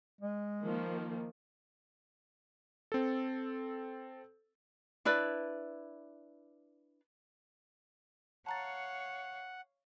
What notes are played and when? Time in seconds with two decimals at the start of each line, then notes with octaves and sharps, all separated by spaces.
0.21 G#3
0.64 D#3 F3 A#3
2.92 C4 A4
5.05 D4 E4 B4 D5
8.46 C#5 F5 F#5 A5 A#5 A6